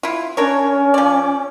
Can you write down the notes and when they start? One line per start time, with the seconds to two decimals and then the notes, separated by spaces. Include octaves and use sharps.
0.03 E4 F4
0.37 C#4 D4 A#4 C#5
0.94 F3 D5